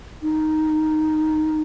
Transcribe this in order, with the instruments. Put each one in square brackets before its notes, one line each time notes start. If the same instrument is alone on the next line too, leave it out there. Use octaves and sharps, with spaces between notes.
[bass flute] D#4